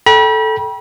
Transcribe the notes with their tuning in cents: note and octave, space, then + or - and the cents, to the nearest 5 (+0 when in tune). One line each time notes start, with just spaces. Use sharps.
A4 -10 G5 +0 B5 -40